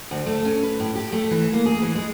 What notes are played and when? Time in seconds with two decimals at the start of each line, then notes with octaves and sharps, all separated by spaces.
0.11 D2
0.26 A3
0.45 C#4
0.63 B4
0.80 A2
0.95 G4
1.12 A3
1.31 E3
1.53 A#3
1.66 G#4
1.82 E3
1.95 G#3